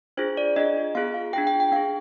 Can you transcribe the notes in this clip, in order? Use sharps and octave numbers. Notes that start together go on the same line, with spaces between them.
D4 F4 G#4 C5
D5
D4 F4 G#4 D#5
B3 F4 G#4 F5
F5
D4 F4 G#4 G5
G5
G5
D4 G#4 F5